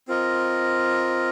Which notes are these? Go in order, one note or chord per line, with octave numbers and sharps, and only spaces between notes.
C4 F4 A#4 D#5